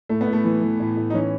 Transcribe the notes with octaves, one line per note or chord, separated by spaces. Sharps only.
A2 A3
B3
A2
A3
E3
E3
A2
A2
D#4
E3 C#4